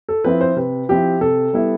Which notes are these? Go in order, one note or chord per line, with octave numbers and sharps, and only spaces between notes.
A4
F3 C4 E4 B4
C5
C3 B4
F3 C4 E4 G4
C3 A4
G3 B3 E4